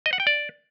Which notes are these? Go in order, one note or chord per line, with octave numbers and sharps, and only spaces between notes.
D#5
F#5
G5
D5